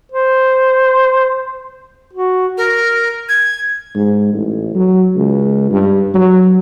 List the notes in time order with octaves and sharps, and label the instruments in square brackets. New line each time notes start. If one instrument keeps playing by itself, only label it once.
[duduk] C5
F#4
[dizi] A#4
G#6
[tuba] G#2
A1
F#3
C#2
G2
F#3